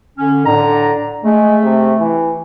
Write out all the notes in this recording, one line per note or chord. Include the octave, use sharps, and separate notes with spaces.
D3 C#4
A2 D3 A#5
G#3 A3
C3
E3